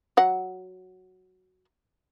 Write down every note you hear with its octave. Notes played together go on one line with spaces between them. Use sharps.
F#3 F#5